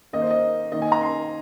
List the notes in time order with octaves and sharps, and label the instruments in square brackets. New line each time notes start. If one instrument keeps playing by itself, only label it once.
[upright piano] D#3 A#3 D#4 D#5
C5
D#5
D#3 A#3 D#4 D#5
G#5
A#5
C6